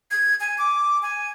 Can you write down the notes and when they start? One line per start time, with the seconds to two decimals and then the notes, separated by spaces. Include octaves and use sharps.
0.11 G#6
0.40 G#5
0.58 D6
1.02 G#5